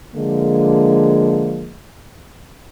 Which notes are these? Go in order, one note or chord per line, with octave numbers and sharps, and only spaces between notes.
D3 F3 G#3 A#3